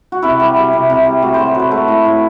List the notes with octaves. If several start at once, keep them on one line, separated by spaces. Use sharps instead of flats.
F#4
C3 E4
G3
G3
C3
C3
G3
A2 F#4
A2 C5
C5
F#3 B4
A3
A2
A2